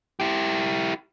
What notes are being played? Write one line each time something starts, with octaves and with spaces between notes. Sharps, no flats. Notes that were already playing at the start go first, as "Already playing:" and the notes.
E4 G4